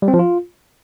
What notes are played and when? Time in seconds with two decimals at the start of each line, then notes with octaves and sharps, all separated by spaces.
0.02 G3
0.08 C4
0.14 F3
0.19 F4